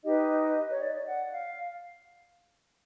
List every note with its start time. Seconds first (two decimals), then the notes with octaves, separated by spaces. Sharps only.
0.05 D#4 G4 B4 D#5
0.71 C#5
0.80 D5
1.06 F#5
1.31 F5